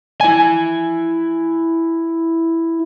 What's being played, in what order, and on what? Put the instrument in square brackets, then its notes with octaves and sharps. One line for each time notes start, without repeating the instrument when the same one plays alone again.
[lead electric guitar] E4 G#5